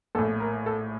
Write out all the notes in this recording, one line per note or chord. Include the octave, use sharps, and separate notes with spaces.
A#1 A2 A4
A#4
A4